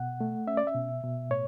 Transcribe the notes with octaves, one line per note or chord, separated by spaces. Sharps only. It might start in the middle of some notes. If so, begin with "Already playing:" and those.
Already playing: B2 F#5
A3
C#4 E5
D5
E5
B2
B2
A2 C#5